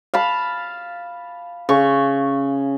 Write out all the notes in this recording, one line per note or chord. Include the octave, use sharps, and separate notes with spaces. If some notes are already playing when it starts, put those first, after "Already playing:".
F5 A5 B5
C#3 C#6